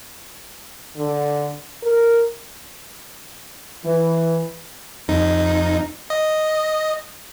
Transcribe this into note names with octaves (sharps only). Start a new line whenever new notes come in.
D3
A#4
E3
F2 D#4
D#5